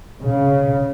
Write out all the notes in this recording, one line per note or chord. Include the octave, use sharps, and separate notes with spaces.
C#3